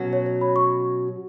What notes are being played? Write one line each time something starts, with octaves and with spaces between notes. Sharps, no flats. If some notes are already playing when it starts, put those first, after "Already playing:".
Already playing: B2 F#3 C#4 F#4
C#5
C#5
B5
C#6